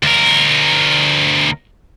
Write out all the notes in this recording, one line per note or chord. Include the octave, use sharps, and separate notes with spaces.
D2 A#4